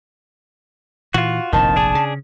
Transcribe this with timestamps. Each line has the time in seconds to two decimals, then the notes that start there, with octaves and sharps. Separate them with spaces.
1.14 A#2 E3 F4 F#4
1.53 F1 A#1 F2 A2 D#3 A5
1.76 D4 G#4
1.95 C#3